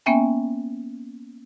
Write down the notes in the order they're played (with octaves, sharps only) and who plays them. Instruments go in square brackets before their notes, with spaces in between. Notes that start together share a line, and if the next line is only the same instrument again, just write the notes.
[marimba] A#3 B3 C#4 E5 G5 G#5